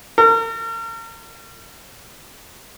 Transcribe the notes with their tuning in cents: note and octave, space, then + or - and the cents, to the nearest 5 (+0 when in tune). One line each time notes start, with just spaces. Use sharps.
A#4 -40